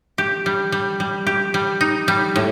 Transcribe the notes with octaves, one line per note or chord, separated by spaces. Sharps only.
G4
G3
G3
G3
G4
G3
D#4
G3
A2